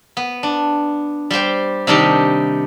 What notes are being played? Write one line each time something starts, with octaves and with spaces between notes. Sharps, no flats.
B3
D4
G3 G4 C5 G5
C3 D#3 G3 D4 D#4 G4